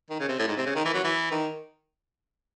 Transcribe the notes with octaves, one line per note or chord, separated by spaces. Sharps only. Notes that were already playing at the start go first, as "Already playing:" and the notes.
D#3
C#3
C3
A2
G#2
C3
C#3
D#3
E3
F#3
E3
D#3